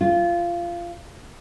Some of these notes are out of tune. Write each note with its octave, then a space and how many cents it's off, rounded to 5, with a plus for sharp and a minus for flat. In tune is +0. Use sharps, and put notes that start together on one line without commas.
F4 -15